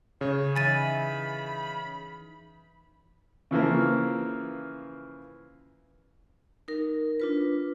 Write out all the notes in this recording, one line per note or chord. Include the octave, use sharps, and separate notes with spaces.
C#3 C#5
E3 D#4 E5 G#5 B5 A6 D#7
C#3 E3 F3 A#3
D#4 A#4
D4 F4 B4